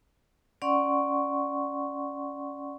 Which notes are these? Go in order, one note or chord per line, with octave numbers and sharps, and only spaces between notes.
C#4 D5 F#5 C6 C#6